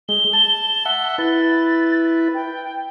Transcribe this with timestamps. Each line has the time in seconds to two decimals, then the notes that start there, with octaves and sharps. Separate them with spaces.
0.09 G#3 G7
0.33 A5
0.85 E5 F#5
1.18 E4 B4 A6
2.34 G5